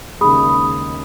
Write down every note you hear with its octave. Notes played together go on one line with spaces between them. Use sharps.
D#2 C#3 G#3 B5 D#6